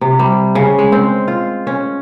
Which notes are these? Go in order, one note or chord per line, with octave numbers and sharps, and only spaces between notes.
C3
G3
C#3
G#3
C4
F4
C#4